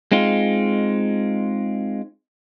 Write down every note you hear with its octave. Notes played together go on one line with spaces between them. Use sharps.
G#3 C4 D#4 F4